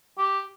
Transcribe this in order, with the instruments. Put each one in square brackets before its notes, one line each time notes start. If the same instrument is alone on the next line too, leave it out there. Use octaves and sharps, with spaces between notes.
[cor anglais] G4